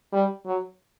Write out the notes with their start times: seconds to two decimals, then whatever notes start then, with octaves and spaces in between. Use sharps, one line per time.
0.13 G3
0.46 F#3